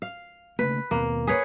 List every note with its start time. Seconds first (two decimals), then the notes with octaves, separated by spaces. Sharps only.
0.02 F5
0.59 C#3 A3 A#3 B4
0.91 D#2 B2 A#3 C4
1.27 G#4 B4 C#5